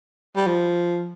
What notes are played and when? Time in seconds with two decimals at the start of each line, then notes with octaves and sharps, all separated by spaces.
0.36 G3
0.47 F3